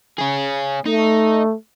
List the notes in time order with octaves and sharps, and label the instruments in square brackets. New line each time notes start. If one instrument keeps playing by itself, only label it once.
[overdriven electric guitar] C#4 G#4
[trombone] A3 [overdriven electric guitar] D#4